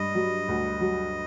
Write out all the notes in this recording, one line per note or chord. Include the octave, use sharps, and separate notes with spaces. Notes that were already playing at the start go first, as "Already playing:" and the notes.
Already playing: G2 D#5
F#3
D2
F#3